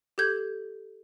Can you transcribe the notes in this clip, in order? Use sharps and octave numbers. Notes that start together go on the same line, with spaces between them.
G4 A4 G6 G#6